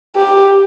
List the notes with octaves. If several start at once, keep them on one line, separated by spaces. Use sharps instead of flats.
G4